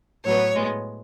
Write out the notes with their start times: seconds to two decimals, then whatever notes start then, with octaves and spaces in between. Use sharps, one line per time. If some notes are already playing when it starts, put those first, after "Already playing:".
0.25 A2 F#3 B3 C#5
0.55 A2 G#3 B3